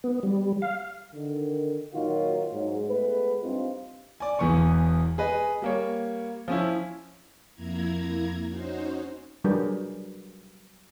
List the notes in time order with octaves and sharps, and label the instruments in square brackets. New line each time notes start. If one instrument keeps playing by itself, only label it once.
[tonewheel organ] B3
G3
F5
[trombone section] D3 D#3
A#2 D#3 F#3 D#4 F4 F#4
G#2 F#3
G#3 A3 B3 B4
G2 C4 D#4 F4
[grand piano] D5 G#5
E1 E2 E3 B3 G#5 C#6
G#4 B4 D#5
G3 A#3 C#5
F3 C#4 E4
[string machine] F2 A#3 E4 A#5 G#6
C#4 D#4 F#4 C5
[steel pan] F#3 G3 D4 G#4 A#4 B4